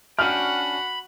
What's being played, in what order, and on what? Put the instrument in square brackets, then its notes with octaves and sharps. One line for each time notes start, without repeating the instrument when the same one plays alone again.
[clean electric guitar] C#4 D4 G5 [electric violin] F#4 F#5 [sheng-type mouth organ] B5 [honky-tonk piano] F6